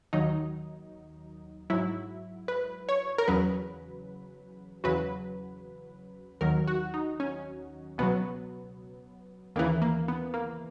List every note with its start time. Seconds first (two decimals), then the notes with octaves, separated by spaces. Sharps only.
0.13 D#2 D#3 F#3 D#4
1.70 G#2 F#3 E4
2.48 B4
2.89 C#5
3.18 A#4
3.28 E2 C#3 F#3 B4
4.84 E2 C#3 F#3 B4
6.41 D#2 D#3 F#3 A#4
6.67 F#4
6.94 D#4
7.20 C#4
7.98 C#2 B2 F#3 B3
9.56 D#2 C#3 E3 A#3
9.82 A#3
10.08 B3
10.34 A#3